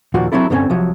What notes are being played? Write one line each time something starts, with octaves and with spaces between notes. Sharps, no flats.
D#2 A#2 F3 A#3 F#4
F#3 C4 D4 E4 A4
G2 D3 F3 C4 C#4 G#5
C2 F3 F#3